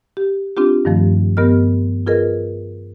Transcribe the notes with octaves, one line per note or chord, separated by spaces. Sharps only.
G4
C4 D4 F4 G4
G2 D#3 F3 A3
G2 B3 G4 A#4 D#5 F6
F4 G#4 A#4 B4 D#5